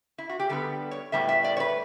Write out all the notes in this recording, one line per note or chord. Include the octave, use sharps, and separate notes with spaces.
E4
F#4
G4
D3 G3 B3 A4
C#5
A2 G3 B3 E5
E5
D5
C#5
B4